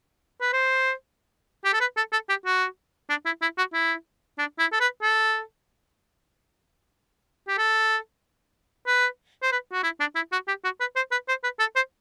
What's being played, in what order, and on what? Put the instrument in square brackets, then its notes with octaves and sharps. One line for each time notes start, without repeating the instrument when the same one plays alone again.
[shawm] B4
C5
G4
A4
B4
A4
A4
G4
F#4
D4
E4
E4
F#4
E4
D4
E4
A4
B4
A4
G4
A4
B4
C5
B4
F#4
E4
D4
E4
F#4
G4
F#4
B4
C5
B4
C5
B4
A4
C5